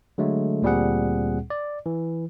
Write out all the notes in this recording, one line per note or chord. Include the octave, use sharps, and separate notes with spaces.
D3 F#3 G#3 A3
D2 A#2 G3 C4 G#4 F#5
D5
E3